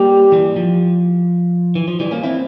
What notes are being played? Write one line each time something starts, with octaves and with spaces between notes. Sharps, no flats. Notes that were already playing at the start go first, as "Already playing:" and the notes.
Already playing: G3 A#3 G4
E3 G3
F3
E3
F3
E3 G3
A#3 C#4
C4 E4